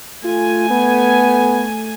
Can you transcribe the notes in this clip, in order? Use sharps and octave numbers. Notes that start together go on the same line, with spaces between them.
A3 F4 G#5
B3